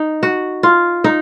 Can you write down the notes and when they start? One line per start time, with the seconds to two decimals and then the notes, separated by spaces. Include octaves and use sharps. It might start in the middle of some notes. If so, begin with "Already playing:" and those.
Already playing: D#4
0.23 F#4
0.63 F4
1.04 D#4